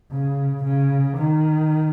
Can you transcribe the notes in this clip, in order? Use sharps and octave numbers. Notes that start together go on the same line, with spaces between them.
C#3
C#3
D#3